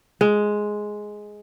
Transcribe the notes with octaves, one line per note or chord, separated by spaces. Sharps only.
G#3